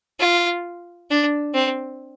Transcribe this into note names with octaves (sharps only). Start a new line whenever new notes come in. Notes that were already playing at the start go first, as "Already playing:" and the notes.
F4
D4
C4